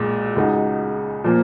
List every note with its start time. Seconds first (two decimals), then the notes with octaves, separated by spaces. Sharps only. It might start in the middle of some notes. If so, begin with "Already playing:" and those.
Already playing: B1 A#2 G#3
0.36 C#2 C#3 G#3 D#4 F#4
1.24 A#2 F3 A#3